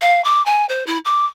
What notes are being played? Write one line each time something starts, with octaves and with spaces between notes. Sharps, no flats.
F5
D6
G#5
C5
E4
D6